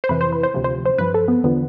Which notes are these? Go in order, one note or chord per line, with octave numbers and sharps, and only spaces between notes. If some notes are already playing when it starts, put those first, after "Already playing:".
C5
F2 C3 E3 B4
C5
B4
C5
D2 C3 F3
C5
C5
G2 F3 B4
A4
B3
E2 D3 F3 B3